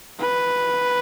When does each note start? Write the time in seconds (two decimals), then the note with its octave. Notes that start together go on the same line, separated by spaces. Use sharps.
0.20 B4